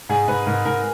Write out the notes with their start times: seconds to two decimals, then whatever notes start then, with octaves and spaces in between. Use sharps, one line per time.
0.09 G#2 G#4
0.28 G#2 B4
0.46 G#2 A#4
0.65 G#2 A#4